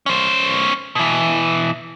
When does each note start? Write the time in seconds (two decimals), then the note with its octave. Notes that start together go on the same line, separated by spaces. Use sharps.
0.06 C#4 C5
0.95 B2 E3